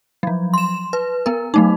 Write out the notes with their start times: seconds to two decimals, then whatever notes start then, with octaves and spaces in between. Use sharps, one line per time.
0.23 F3 F#3
0.54 C6 E7
0.93 B4
1.26 B3 A#4
1.54 F#3 A3 D#4